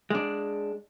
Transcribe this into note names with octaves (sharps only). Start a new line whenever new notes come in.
G#3 D4